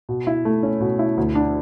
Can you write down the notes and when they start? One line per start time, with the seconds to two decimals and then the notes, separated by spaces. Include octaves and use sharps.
0.09 B2
0.27 E4
0.45 A3
0.63 C#4
0.81 B2
0.99 E4
1.17 D2
1.35 D4